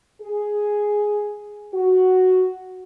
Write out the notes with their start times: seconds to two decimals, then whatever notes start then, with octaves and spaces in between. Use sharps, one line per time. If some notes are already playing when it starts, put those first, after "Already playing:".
0.22 G#4
1.73 F#4